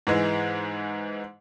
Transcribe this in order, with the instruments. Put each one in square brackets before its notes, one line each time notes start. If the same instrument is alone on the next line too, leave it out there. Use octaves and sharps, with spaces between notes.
[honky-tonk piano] G#2 E3 G#3